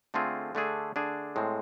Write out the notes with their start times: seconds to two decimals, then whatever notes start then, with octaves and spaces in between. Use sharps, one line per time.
0.14 D3 A3 C4 F4 G#4
0.55 D3 A3 D4 G#4
0.96 D3 A3 D4 G#4
1.36 A2 G#3 C4